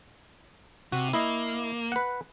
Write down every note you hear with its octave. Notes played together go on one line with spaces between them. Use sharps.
C3 F#4
A#3 E4 D#5
B4 F#5